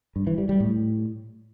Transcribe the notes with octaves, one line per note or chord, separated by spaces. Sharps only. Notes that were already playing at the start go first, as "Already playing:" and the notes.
G2
E3
G3
G3
A2